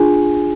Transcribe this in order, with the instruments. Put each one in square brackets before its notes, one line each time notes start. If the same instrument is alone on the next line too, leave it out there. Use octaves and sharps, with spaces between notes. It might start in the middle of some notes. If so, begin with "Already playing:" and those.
Already playing: [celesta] D4 F4 G#4 G#5